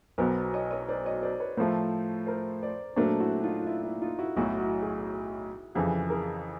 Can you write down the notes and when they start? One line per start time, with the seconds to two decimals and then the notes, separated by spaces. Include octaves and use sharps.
0.18 B1 B2 F#3 B3 A#4 C5
0.54 C#5 D#5
0.71 C#5 D#5
0.89 C5 D5
1.06 C#5 D#5
1.23 C5 D5
1.40 B4 C#5
1.57 A2 F3 A3 A#4 C5
2.27 A#4 C5
2.63 C5 D5
2.96 A#2 F#3 A3 D4 A#4 C5
3.20 E4 F#4
3.43 D#4 F4
3.62 F4
3.67 E4
3.84 E4
4.02 D#4 F4
4.19 E4 F#4
4.36 B1 A2 F#3 E4 F#4
4.59 E4 F#4
4.82 F#4 G#4
5.75 F2 C#3 E3 G4 A4
6.10 G#4 A#4